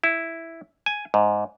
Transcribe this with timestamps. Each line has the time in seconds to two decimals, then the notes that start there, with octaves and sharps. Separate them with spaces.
0.04 E4
0.86 G#5
1.14 G#2